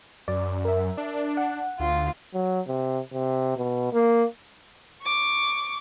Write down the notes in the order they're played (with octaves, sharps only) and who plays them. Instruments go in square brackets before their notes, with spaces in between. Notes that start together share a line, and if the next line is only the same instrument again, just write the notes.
[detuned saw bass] F#2 [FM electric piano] D5
[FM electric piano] A#4 E5
[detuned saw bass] D4
[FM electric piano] F#5
[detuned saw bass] D2 [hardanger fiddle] F4
[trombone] F#3
C3
C3
B2
A#3
[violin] C#6 D6